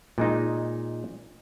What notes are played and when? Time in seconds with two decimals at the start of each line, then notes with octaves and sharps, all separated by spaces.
0.18 A#2 G#3 D#4